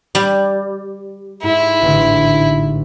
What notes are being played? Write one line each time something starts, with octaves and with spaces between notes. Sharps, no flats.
G3
G#2 E4
A1 G#2 D3